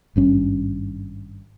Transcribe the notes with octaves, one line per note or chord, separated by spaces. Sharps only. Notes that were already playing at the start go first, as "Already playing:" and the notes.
G#1 G2 C#4